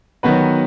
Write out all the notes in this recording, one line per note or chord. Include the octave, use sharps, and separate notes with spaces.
D#3 F#3 B3 F#4 B4